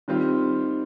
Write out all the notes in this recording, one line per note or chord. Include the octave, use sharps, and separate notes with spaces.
D#3 G3 C4 F4